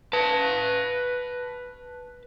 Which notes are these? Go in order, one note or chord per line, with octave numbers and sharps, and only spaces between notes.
B4 A5